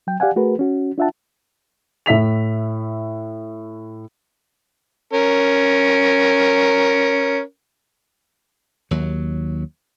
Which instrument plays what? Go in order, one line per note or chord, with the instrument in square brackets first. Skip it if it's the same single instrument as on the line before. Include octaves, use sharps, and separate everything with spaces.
[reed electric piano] F#3 G5
G4 D5 F5 F#5 G#5
A3 F#4 G#4 A#4 B4
C#4 F#4
D4 F4 E5 F#5 A5
[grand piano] A2 E5 B6 F7
[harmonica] C#4 A#4
[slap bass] D#2 F#3